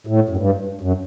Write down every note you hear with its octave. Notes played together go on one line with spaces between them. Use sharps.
A2
F#2
G2
F#2